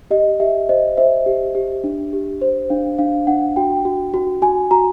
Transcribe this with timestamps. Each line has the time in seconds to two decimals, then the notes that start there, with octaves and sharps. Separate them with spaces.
0.11 G4 D#5
0.40 G4 E5
0.69 C5 D#5
0.97 C5 E5
1.26 G4
1.55 G4
1.84 D4
2.13 G4
2.41 C5
2.70 D4 F5
2.98 D4 F5
3.27 D4 F#5
3.56 F#4 G5
3.85 F#4
4.14 F#4
4.42 F#4 G#5
4.71 F#4 A#5